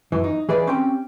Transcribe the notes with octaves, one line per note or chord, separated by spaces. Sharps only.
F#2 E3
D#4
E3 G#4 B4 D5 D#5
C4 C#4 G4 G5